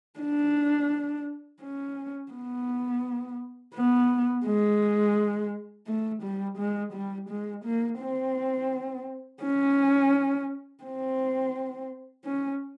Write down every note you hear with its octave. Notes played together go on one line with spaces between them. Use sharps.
D4
C#4
B3
B3
G#3
A3
G3
G#3
G3
G#3
A#3
C4
C#4
C4
C#4